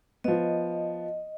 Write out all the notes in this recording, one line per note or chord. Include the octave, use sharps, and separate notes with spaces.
F3 B3 D#5